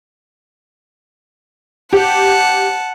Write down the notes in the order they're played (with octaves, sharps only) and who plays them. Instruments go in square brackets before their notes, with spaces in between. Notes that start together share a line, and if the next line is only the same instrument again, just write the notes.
[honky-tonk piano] G4 [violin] F#5 A5